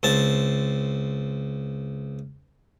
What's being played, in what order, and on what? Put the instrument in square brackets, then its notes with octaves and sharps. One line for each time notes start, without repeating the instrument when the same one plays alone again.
[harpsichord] C#2 C4 A5